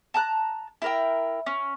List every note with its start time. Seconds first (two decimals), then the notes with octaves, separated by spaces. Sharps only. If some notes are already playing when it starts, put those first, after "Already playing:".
0.14 A5 A#5 F#6
0.82 E4 A#4 G5
1.46 C#4